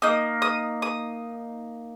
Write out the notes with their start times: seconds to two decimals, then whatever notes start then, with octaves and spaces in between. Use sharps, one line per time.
0.02 A#3 D#4 D#6
0.42 D#6
0.82 D#6